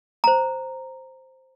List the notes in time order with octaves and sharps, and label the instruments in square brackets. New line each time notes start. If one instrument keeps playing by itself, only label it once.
[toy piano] C5 A#5